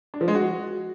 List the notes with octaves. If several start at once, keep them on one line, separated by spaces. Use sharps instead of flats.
D4
F3
G#3
F#4